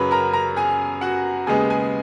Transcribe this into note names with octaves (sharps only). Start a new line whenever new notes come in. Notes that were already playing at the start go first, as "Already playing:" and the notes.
Already playing: F#2 C#3 F#3 B4 C#5 B5
A#4 A#5
A#4 A#5
G#4 G#5
F#4 F#5
D#2 C#3 G#3 B3 G#4 G#5
G#4 G#5